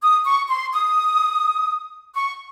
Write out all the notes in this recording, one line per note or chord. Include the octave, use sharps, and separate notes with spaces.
D#6
C#6
C6
D#6
C#6